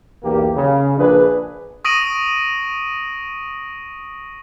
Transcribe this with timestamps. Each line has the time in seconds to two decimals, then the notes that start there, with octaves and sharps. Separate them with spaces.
0.23 B1 E2 A#3 G4
0.55 C#3
0.97 A#1 D4 G#4 B4
1.84 C#6 D#6 A#6 D7 D#7 F#7